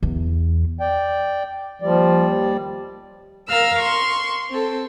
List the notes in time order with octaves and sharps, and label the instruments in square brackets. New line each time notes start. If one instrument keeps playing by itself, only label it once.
[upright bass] E2
[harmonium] D5 G5
[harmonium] D#2 G3 D5 [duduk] F3
[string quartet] A#4 F5 E6 F6
C6 C#6
C4 A4